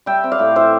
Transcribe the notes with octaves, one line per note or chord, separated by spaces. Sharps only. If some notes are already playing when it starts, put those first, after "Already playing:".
G3 E5 G5
C4
D5 F5
A2
E3 C5 E5